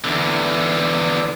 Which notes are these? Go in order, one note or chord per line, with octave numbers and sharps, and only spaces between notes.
E2 D3